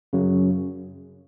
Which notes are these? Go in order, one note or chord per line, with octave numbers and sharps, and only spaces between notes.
F#2 C#3 F#3